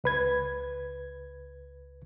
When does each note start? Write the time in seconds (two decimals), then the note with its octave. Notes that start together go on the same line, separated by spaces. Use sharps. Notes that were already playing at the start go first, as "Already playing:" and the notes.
0.04 C#2 B4 G#6